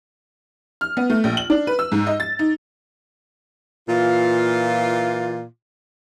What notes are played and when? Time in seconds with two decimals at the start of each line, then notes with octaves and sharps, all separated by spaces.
0.81 F6
0.97 B3
1.10 A3
1.24 A#1
1.37 F#7
1.50 D4
1.67 B4
1.79 E6
1.92 G#2
2.07 D#5
2.20 A6
2.39 D#4
3.89 A#2 E3 F4